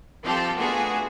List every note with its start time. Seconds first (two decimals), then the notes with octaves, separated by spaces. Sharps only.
0.23 F3 C4 F4 G4 A4
0.58 A3 B3 D4 F4 F#4 G#4